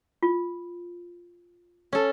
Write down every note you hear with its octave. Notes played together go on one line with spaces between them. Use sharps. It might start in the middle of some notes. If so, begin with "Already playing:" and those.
F4
C#4 A4